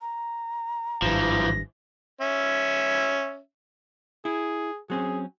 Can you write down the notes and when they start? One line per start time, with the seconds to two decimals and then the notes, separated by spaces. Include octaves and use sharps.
0.01 A#5
1.02 G#1 G2 E3 F3 A#6
2.21 C#4 E5
4.25 E4 G#4
4.90 F#3 C4 C#4 G#4